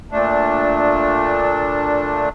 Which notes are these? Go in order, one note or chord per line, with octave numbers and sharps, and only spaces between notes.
A#2 A3 D4